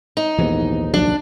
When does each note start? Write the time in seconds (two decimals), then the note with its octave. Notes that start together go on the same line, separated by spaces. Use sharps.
0.17 D#4
0.38 A#1 D#2 G#2 E3 B3
0.94 C2 F3 F#3 D4